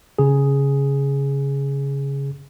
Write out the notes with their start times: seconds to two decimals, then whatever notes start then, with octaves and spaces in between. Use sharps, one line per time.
0.19 C#3 G#4